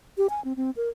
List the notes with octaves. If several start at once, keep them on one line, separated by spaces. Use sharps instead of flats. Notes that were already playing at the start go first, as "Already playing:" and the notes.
G4
G#5
C4
C4
A#4